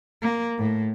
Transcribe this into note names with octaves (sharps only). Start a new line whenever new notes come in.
A#3
A2